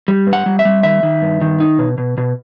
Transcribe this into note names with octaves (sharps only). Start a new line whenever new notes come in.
G3
G2
F#5
G3
E5
G3
D#3 E5
D#3
G2
D#3
D#4
B2
B2
B2